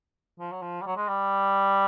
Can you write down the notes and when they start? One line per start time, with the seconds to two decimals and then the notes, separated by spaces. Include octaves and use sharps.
0.40 F3
0.52 F#3
0.62 F3
0.82 G3
0.86 F#3
0.97 G#3
1.08 G3